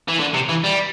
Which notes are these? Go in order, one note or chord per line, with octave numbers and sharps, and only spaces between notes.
E3
D3
C3
E3
G3